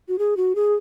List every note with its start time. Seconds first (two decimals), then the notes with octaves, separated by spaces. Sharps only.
0.08 F#4
0.19 G#4
0.37 F#4
0.55 G#4